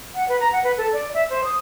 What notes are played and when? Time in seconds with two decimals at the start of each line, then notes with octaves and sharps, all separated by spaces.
0.15 F#5
0.29 B4
0.40 A#5
0.52 F#5
0.64 B4
0.78 A4
0.93 D5
1.14 E5
1.30 C5
1.44 D#6